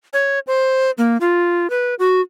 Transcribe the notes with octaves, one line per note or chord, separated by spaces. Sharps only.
C#5
C5
A#3
F4
B4
F#4